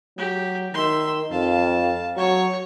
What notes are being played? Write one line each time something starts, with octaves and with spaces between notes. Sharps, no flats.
F#3 G4
D#3 E5 C6
F2 F5 A5
F#3 C#5 C#6